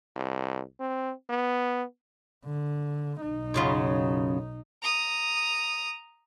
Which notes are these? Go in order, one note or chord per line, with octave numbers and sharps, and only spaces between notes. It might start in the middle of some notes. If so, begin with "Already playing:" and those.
C2
C4
B3
D3
B1 D#4
F#2 C#3 F4
A#5 D#6